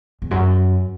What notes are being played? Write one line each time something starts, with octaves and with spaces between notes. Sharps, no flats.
E2
F#2